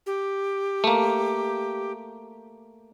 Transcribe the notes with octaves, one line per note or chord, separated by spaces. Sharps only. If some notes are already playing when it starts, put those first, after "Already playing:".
G4
A3 A#3